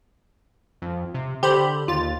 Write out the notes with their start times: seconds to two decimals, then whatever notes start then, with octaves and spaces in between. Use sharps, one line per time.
0.82 F2
1.14 C3
1.43 D3 G4 C5 B5
1.88 D#2 F4 A6